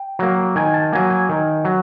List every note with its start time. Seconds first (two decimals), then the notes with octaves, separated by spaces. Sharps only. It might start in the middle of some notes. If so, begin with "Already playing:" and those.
Already playing: G5
0.19 F#3 A#3
0.55 D#3 G#5
0.74 A5
0.93 F#3 A#3 G#5
1.10 G#5
1.29 D#3
1.65 F#3